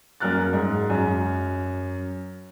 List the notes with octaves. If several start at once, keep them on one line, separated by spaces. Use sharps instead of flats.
F#2 A#3 A#4 F6 F#6 A6
G#2
F#2